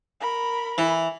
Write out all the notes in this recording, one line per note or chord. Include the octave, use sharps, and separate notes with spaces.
A#4 B5
E3